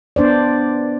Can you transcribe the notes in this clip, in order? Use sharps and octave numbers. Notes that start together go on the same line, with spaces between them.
B3 D4 C5 D5